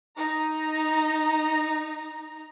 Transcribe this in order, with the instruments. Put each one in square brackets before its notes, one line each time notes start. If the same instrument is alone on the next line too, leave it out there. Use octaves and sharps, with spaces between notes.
[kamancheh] D#4 A#5